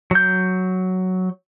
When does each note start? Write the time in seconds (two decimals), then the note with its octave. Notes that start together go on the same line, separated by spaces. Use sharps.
0.11 F#3 G6